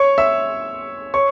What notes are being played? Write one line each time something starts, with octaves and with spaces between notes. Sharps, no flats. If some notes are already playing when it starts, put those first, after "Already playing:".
Already playing: C#5 C#6
E5 E6
C#5 C#6